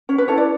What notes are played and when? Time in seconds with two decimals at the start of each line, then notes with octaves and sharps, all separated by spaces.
0.09 C#4 C#5
0.18 B4
0.28 E4 A4 C#5
0.38 D5